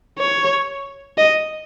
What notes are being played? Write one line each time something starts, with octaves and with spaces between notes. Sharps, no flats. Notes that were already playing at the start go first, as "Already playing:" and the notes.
C#5
D#5